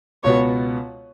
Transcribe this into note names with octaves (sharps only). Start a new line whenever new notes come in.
C#2 B2 B3 F#4 C#5